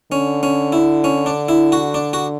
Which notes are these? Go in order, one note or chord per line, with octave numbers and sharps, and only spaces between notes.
D3 C#4
C#4
E4
C#4
D4
E4
F#4
D4
F#4